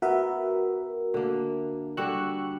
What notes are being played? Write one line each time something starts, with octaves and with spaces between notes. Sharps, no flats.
B3 F#4 A#4 E5
D3 A#3
D3 G3 F#4 C#6 E6 F#6